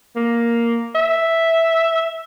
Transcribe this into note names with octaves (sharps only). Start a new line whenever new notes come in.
A#3
E5